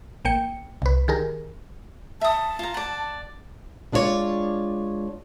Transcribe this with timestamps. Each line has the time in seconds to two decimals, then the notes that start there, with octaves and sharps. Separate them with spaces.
0.25 A1 A#3 G5 C#7
0.82 C2 B4
1.08 D#3 G4 G#4 A#4
2.21 E5 A5 D#6
2.59 F4 A#5
2.74 D5 F#5
3.92 G#3 D4 F4 F#4 C#5 D5